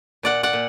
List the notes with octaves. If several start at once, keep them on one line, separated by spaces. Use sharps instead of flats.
A#2 D5 F#5
D5 F#5
A#2